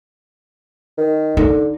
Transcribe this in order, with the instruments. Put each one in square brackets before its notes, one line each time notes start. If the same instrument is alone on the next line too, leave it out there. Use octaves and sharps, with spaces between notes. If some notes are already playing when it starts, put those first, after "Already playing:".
[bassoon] D#3
[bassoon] D3 [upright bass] D#4